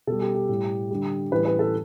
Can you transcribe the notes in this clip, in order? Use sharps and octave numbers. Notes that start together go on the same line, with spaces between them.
B2 G3 A4
G4
G4
A2 G3
D3 G3
A2 E3 G3 B4
B4
A4